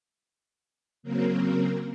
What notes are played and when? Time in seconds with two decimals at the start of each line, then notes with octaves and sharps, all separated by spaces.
1.03 C#3 F#3 A#3 C4 A#4